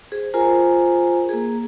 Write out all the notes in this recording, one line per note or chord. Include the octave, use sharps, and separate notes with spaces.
G#4 C5
F4 G#4 A#4 C5 G#5 A#5
A#3 G#4